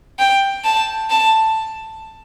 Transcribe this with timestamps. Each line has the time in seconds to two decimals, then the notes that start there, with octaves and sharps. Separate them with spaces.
0.19 G5
0.64 A5
1.10 A5